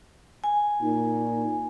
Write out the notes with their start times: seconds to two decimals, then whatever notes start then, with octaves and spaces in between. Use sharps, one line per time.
0.44 G#5
0.81 A#2 D#4